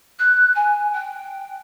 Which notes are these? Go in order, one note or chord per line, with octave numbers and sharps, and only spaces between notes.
F#6
G#5
G5